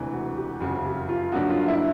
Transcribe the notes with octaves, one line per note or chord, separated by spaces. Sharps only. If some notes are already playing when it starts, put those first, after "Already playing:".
Already playing: E1 D2 C3 E3
F#4
G4
F#1 F2 C#3 F#4
G4
F4
G2 D3 F#3 A#3 D#4 F#4
F4
E4